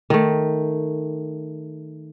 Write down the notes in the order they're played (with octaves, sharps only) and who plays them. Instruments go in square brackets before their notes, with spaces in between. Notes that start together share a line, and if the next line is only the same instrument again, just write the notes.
[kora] D#3 A3